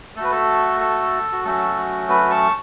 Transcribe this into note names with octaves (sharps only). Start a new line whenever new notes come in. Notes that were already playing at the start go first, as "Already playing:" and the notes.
A3 F#4 A4 B4
A4
A4
F#4
F#3 A3 C#4 F#4 A4
F#4 B4
A5 C#6